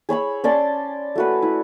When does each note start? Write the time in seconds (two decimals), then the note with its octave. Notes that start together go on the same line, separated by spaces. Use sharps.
0.09 G#4 C#5 B5 E6
0.44 C#4 D5 A5 C6
1.16 A3 F#4 B4
1.42 E4